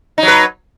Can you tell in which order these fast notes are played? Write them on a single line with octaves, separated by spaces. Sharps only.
D#4 F#3 B4